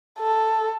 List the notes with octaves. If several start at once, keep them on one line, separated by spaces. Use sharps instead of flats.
A4